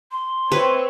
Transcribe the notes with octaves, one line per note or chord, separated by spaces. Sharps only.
C6
C4 B4 C#5 E5